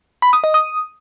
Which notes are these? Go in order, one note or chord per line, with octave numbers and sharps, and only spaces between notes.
B5
D#6
D#5
D#6